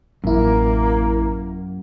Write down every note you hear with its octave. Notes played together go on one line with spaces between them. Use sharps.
A1 F#2 A#3 E4